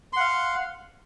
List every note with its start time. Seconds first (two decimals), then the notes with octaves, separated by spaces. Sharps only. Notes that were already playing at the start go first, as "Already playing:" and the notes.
0.13 C6
0.16 F#5
0.20 F5